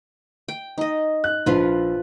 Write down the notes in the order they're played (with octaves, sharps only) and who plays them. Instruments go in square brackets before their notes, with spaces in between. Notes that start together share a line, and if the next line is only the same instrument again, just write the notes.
[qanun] G5
D#4 D#5
[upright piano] F#6
[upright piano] A#1 [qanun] F3 F4 B4